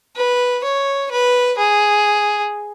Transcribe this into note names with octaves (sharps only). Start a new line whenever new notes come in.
B4
C#5
B4
G#4